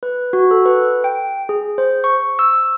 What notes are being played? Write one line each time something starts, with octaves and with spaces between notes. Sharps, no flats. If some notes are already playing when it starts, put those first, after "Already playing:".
B4
F#4
A4
B4
G5
G#4
C5
C#6
E6